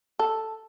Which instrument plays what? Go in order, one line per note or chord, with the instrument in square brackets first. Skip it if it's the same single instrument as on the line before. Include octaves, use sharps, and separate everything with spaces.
[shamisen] A4